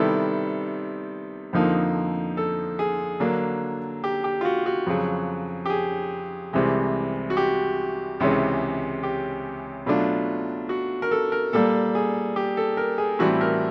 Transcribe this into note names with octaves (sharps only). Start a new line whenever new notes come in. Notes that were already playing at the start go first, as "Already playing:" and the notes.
Already playing: C3 D#3 G3 B3 E4 A4
F2 D3 F3 A#3 D#4
A4
G#4
D3 F#3 A#3 D4
G4
G4
F4
F#4
F#4
F2 C#3 F#3
G4
G#4
C2 C3 E3 G#3
F#4
G4
C#2 C3 E3 G#3 C#4
G4
B2 F#3 A3 D4 F4
F#4
A#4
A4
A#4
A#2 G3 A#3 A4
G#4
G4
A4
A#4
G#4
A2 E3 G3 C4 F#4
A#4